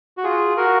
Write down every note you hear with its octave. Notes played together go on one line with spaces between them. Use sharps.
F#4
F4 G#4
F#4 A#4